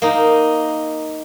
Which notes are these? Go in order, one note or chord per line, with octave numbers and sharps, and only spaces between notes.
A#3 D#4